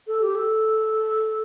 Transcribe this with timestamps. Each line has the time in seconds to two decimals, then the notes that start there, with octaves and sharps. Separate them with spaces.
0.07 A4
0.22 G4
0.35 A4